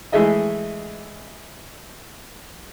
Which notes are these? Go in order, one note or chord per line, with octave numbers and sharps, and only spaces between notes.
E3 G#3 A3 G#4 D#5 E5